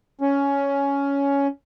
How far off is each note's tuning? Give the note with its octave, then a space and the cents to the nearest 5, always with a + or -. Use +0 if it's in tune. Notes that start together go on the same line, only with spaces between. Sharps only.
C#4 +10